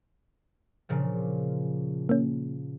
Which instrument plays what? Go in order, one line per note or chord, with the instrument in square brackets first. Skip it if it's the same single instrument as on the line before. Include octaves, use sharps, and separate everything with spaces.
[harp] A#2 C#3 F3
[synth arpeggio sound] A#3 C#4